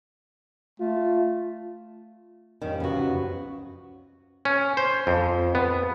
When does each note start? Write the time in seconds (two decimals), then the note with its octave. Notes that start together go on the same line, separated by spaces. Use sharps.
0.80 A3 F4
2.62 F2 D#3 G3 C#4
2.80 F#1 C#2 F#2 B3 F#4
4.45 C#4
4.77 C5
5.07 F2
5.55 B3